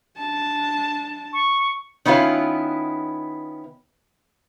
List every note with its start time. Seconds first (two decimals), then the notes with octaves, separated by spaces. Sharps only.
0.18 D4 A5
1.33 C#6
2.05 D#3 B3 C#4 E4 F4 B4